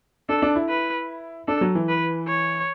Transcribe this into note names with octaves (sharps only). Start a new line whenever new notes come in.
D4 A4
D4
E4
B4
D4 A4
F#3
E3
B4
C#5